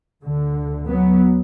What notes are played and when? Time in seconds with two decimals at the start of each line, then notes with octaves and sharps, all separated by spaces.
0.24 D2 D3
0.88 F#3 B3